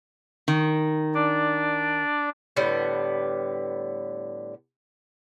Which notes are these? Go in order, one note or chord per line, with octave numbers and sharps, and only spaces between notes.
D#3
D4 D5
A2 D3 G3 B3